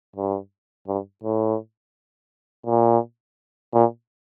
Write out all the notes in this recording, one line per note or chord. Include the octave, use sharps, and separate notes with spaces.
G2
G2
A2
A#2
A#2